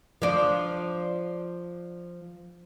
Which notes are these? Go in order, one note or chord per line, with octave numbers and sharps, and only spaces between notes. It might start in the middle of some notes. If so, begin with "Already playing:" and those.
F3 D4